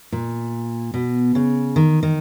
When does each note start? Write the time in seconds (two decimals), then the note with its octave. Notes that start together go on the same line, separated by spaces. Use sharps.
0.12 A#2
0.94 B2
1.35 C#3
1.76 D#3
2.03 D#3